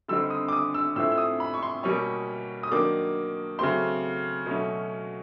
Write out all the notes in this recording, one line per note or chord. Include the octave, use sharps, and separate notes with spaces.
D3 G3 C4 D#4 E6
D#6
D6
D#6
E6
A2 F3 A3 C4 E4 E6
E6
D#6
B5
C#6
C6
B2 G3 A#3 C#4 C#6
D#6
D#3 F#3 A#3 D4 D6
C#3 F#3 A3 C4 C6
B2 F#3 A3 C#4